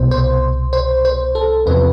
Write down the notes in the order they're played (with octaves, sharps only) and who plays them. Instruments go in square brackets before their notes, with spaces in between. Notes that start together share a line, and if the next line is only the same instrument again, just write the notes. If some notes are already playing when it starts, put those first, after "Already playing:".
Already playing: [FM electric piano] C2 B2 C5
C5
C5
C5
A4
E2 C3 F3 B4